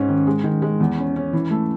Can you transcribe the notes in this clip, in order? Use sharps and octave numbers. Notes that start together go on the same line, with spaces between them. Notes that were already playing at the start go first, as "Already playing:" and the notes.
Already playing: G#2 C#4
D#3
G#3
D#3
G#3
E2
C#4
C#4
E3
A3